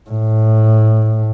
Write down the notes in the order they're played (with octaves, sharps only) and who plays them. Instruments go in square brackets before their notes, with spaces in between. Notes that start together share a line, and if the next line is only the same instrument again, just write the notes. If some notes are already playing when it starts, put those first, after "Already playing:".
[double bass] A2